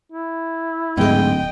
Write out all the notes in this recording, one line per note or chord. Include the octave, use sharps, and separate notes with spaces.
E4
D1 G#2 G#3 D#5 G5